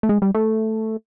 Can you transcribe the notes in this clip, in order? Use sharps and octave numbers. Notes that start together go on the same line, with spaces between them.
A3
G#3
G3
A3